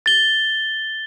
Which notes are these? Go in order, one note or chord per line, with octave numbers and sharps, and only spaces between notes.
A6 G7